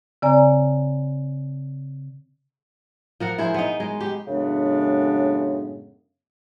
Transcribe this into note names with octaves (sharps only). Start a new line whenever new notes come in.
C#3 C4 D5 G#5 A#5
F3 A#4 F#5
E4 G#4 C5
B3 D#4
G#3
G4
F#2 A2 C#3 G#3 B3 D4